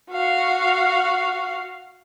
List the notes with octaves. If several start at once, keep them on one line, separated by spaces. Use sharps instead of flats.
F#4 F5